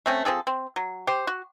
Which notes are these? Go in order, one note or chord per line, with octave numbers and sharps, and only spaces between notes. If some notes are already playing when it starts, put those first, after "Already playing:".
A3 C4 C#4
F3 C4 G#4 A4
C4
F#3
G4 C5
F#4